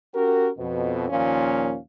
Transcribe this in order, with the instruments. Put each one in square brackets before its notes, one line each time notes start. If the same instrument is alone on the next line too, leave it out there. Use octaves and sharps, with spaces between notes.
[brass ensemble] C#4 F#4 G4 A#4
F2 B2
D#2 A#2 F3 C#4 F5